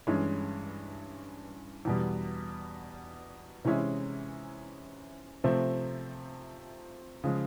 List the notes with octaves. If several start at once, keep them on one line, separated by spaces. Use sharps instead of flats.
G2 E3 G#3 C#4
E2 B2 G3
C3 E3 G#3 C#4 E4
C3 F3 A3 C4
C#3 F3 G#3